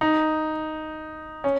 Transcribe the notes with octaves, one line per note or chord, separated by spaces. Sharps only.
D#4
C#4